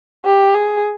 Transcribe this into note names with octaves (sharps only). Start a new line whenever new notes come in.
G4
G#4